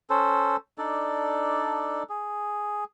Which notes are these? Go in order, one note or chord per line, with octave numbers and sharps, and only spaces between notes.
C#4 A4 C5
D4 D#4 A4 D5
G#4